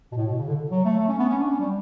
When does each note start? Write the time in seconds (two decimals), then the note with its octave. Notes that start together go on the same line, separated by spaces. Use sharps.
0.12 B2
0.17 A2
0.27 B2
0.38 C#3
0.47 D3
0.72 F#3
0.85 A3
0.99 A3
1.09 C#4
1.19 B3
1.29 C#4
1.39 D4
1.50 C#4
1.60 G3